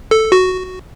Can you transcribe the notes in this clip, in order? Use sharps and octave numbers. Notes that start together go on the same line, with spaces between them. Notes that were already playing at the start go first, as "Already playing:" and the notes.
A4
F#4